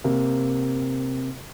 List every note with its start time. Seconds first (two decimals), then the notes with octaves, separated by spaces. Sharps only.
0.04 C3 A#3